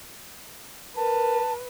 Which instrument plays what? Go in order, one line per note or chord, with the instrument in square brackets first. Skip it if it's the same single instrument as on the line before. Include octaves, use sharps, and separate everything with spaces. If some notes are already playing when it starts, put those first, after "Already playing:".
[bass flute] A#4 [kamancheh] B4 [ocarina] A5